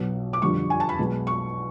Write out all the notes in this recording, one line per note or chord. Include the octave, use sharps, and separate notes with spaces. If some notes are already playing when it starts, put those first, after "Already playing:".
Already playing: B1 B2 F#3
D6
F2 D3 G3 C#6
G#5
A5
B5
B1 B2 G#3
C#6